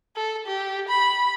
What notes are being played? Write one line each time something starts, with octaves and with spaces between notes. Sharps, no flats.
A4
G4
B5